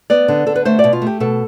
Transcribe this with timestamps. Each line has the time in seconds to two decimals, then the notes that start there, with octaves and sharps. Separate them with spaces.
0.10 B3 D5
0.28 D3
0.47 D3 A4
0.56 B4
0.65 A3 C5
0.79 D5
0.84 B2
0.93 F4
1.02 A3 G4
1.20 B2 A4